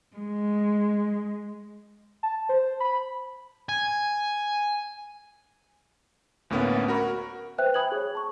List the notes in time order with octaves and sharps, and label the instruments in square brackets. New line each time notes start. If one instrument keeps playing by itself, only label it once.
[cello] G#3
[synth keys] A5
C5
B5
[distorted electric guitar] G#5
[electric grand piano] D2 A2 A#3 B3 C#4
F#4 A#4 B5
[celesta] B4 C5 E5 G5 F#6
G5 G#5 B5 D#6 G#6 F#7
G#4 C#5
A5 C#6